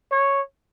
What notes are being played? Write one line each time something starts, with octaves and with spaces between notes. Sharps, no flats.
C#5